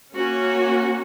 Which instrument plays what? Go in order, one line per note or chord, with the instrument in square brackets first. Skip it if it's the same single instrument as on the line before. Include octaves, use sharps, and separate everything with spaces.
[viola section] A#3 C#4 F#4